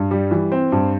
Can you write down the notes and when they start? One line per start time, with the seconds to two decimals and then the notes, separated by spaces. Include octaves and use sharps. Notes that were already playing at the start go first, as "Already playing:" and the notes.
Already playing: G2
0.11 G3
0.31 E3
0.52 C4
0.72 G2